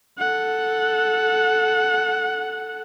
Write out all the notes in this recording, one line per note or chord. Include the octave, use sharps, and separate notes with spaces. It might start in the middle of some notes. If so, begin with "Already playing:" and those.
A4 F#5